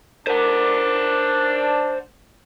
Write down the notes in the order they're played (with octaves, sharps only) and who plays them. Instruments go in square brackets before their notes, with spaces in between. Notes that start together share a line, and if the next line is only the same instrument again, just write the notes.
[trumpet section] D4 [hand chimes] A#4 [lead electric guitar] C5 F#5